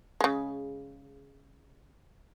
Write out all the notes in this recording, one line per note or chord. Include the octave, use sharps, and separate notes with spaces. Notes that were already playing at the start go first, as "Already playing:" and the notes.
C#3 G#3